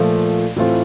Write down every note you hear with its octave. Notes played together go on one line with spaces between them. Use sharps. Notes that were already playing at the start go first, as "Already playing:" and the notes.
Already playing: A#2 F3 A3
A2 E3 A3 C4 F4